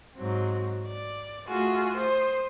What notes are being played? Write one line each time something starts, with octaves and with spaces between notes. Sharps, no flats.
G#2 F#3 C4
D5
A3 F4 F#4 G#4
C5 D#6